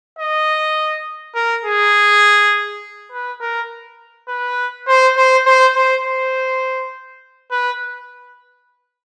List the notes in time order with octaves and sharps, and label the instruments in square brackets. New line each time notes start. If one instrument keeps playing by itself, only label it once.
[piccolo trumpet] D#5
A#4
G#4
B4
A#4
B4
C5
C5
C5
C5
C5
B4